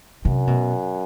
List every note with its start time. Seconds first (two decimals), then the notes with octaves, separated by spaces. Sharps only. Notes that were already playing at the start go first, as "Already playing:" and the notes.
0.25 F#2 C3
0.47 B2